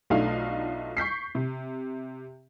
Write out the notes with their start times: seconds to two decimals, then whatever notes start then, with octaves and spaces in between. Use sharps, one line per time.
0.10 B1 A3 D4 D#4 F4 F5
0.97 C#6 G6 B6 C7
1.35 C3